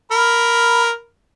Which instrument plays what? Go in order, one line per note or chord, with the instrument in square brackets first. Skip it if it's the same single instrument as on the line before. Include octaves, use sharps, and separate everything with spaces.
[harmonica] A#4 B5